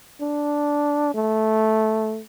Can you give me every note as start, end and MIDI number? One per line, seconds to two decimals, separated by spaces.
0.21 1.09 62
1.14 2.20 57